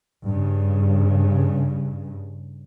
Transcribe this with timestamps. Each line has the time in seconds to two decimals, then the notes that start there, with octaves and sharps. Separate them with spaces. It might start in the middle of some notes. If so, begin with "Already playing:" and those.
0.25 G2 C#3